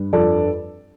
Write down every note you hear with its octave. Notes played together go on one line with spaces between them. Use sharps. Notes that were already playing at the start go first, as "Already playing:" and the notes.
Already playing: G2
F2 A4 D5